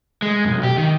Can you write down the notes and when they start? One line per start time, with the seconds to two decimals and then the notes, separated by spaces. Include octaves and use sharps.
0.22 G#3
0.45 B1 F#2
0.63 G4
0.78 D#3